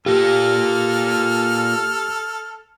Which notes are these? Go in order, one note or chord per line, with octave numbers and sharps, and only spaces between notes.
A#3 F4 G4 A4 F6